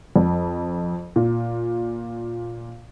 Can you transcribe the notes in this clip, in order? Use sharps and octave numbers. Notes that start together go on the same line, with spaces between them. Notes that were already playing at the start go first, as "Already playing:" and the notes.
F2
A#2